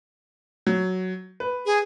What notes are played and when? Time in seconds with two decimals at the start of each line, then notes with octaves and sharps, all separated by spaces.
0.67 F#3
1.40 B4
1.66 G#4